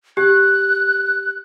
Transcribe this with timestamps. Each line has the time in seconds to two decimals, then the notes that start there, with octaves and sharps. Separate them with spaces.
0.17 G4 F#6